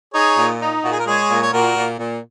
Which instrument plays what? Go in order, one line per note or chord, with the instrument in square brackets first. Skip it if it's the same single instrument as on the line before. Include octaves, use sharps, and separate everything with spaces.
[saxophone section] D#4 [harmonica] G#4 C#5
[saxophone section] A#2
D#4
[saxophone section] A#2 [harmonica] F#4
[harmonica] G#4
A#4
[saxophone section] G#3 [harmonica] G#4 C#5
[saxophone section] A#2
[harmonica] C#5
[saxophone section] A#2 [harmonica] F#4 A#4
[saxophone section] A#2
A#2